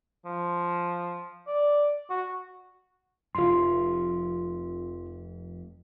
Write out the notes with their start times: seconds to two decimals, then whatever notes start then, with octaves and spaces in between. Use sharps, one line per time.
0.25 F3
1.47 D5
2.10 F#4
3.35 F1 F2 F4 C6